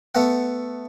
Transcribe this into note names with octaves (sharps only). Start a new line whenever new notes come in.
A3 B3 F#5